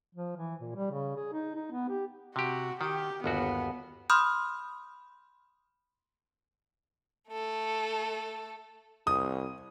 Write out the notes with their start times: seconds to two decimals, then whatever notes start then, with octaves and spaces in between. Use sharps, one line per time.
0.15 F3
0.37 E3
0.61 A#2
0.76 G3
0.91 C#3
1.16 G#4
1.32 D#4
1.55 D#4
1.72 B3
1.89 G4
2.36 C3 F#4 G4
2.81 D#3 G4
3.24 G1 D#2 B3 F#4
4.10 B5 C6 D#6 F6 G6
7.30 A3 A4
9.07 C2 D#6